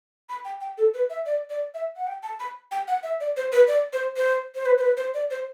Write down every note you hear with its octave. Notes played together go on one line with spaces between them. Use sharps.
B5
G5
G5
A4
B4
E5
D5
D5
E5
F#5
G5
A5
B5
G5
F#5
E5
D5
C5
B4
D5
C5
C5
C5
B4
C5
B4
C5
D5
C5